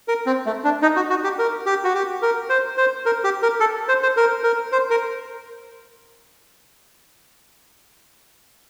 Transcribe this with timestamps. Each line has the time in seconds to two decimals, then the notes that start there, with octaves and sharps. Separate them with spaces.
0.08 A#4
0.26 C4
0.46 A3
0.64 D4
0.82 D#4
0.96 F#4
1.10 F#4
1.24 G4
1.39 A#4
1.66 G4
1.84 F#4
1.94 G4
2.22 A#4
2.49 C5
2.77 C5
3.06 A#4
3.24 G4
3.42 A#4
3.60 A4
3.88 C5
4.02 C5
4.17 A#4
4.43 A#4
4.72 C5
4.90 A#4